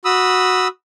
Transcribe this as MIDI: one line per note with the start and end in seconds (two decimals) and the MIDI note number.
0.05 0.68 66
0.05 0.68 83
0.05 0.68 87
0.05 0.68 88